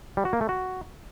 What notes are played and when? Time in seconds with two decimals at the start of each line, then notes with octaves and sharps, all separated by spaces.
0.17 G3
0.25 F#4
0.33 A#3
0.41 A3
0.49 F#4